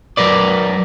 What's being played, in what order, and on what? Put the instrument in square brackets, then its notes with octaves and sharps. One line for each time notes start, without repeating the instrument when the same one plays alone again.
[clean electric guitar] F#3 A#4 B4 D5